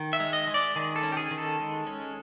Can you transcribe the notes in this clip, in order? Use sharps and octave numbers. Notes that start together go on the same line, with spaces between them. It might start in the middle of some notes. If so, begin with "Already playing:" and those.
Already playing: D#3
E5
G#3
D#5
G#3
D5
D#3 G#4
A4
C#4
G4
G#4
D#3
A4
G#3
C#4